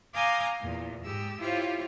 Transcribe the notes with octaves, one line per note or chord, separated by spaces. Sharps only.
F5 G#5 A#5 D6 D#6 G6
E2 A#2
G#2 G#3 G4 E6
E4 F4 G4 C5 C#5 F5